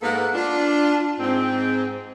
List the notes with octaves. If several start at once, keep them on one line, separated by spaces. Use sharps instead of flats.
G#2 A#3 B3 A4 A#4 F#5
D4 F4
G#2 C4